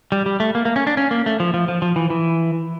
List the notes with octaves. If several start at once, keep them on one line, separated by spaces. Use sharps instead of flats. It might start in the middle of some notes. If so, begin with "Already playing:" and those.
G3
G3
A3
A#3
A#3
C#4
D4
C#4
A#3
A3
F3
F3
F3
F3
E3
E3